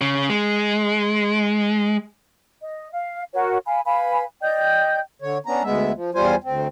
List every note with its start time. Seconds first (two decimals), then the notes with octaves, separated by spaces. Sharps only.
0.01 C#3
0.29 G#3
2.62 D#5
2.93 F5
3.33 F#4 A#4 C#5
3.66 F5 G#5 B5
3.85 B4 F5 G#5 B5
4.42 D5 D#5 G5 G6
5.22 D3 C#5
5.46 B3 C#4 D4 A#5
5.63 D2 G#3 B3 E5
5.94 F3
6.14 E2 G3 F4 C5 G#5
6.44 D2 C4